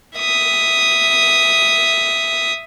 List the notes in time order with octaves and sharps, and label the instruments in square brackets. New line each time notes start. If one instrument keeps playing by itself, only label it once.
[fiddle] E5 D#6